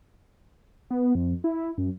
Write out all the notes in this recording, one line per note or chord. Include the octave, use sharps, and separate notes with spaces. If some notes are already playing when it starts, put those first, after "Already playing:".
B3
F2
E4
F#2